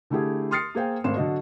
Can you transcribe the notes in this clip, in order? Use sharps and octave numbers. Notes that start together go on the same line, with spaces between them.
D3 A3 E4 G4 G#4
C6 D#6 F6 A6 C7 C#7
A#3 G#4 C5 F5 G5
G#1 A3 C4 C6 E7
D3 F#3 F#4 D#5